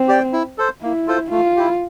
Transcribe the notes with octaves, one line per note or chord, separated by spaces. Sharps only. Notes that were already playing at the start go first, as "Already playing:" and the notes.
Already playing: C4
G4 D5 G5
E4
A4 C5
A#3 E4
F4 A4 C5
A3 F4
E4 G4